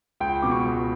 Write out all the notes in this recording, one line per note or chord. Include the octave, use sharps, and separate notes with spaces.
C#2 G5
B2 D6
C#6
C#2